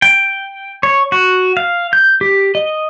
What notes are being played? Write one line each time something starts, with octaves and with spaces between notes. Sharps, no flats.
G5
C#5
F#4
F5
G6
G4
D#5